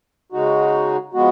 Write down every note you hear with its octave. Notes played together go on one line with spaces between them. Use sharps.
C#3 G#3 D#4 F#4
F3 G#3 B3 F#4